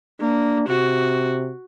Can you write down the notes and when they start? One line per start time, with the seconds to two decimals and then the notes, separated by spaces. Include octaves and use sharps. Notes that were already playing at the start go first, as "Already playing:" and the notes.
0.20 A#3 D4
0.68 C3 F#4